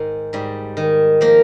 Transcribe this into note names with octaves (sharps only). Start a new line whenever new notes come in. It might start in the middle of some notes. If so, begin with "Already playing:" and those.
Already playing: G#2 D#3
G#2 G3
D#3
F3 A#3